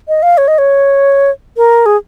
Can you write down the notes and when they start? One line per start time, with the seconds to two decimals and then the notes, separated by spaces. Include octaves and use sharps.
0.08 D#5
0.23 F5
0.38 C#5
0.48 D#5
0.58 C#5
1.57 A#4
1.86 G#4